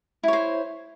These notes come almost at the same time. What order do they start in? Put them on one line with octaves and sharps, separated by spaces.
E4 C#5 C5